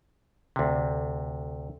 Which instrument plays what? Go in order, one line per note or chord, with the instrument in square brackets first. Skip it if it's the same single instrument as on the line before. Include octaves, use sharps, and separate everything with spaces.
[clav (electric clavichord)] D2 C3